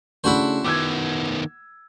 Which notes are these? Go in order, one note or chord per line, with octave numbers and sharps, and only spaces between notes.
C#3 A3 D4 E4 F#4 C5
D#3 B3 D6 E6 G#6